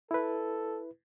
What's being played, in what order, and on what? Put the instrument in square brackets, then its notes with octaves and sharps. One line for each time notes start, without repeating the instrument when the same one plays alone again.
[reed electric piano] E4 B4 [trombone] A4